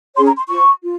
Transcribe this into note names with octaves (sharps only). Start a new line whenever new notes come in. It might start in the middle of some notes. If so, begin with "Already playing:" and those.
C#4 G#4 C#5 C6
A#5
C6
F4 C5 C#6
F4